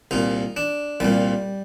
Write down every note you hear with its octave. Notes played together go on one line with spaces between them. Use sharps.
C2 A#2 D#4
D4
C2 A#2 G3